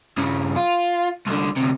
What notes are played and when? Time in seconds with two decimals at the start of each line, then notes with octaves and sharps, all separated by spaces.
0.18 G2 C#3
0.56 F4
1.27 C2 D3
1.57 D2 C3